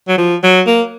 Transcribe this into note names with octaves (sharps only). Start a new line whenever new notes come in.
F#3
F3
F#3
A#3